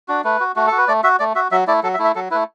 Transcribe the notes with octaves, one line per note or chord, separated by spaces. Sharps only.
D4 F#4
A3 B4
F#4
A3 F#4
F#4 A4
B4
A3 D5
F#4 E5
A3 D5
F#4 E5
F#3 E5
A3 E4 D5
F#3 A4
E5
A3 E4
E5
F#3 A4
A3 E4 B4